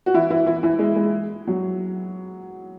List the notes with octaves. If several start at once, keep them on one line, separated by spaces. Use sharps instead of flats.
F#4
E3 E4
E3 E4
E3 E4
E3 E4
G#3
G#3
F#3